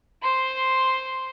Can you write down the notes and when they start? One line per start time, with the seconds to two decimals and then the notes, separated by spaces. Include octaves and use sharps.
0.22 C5 C6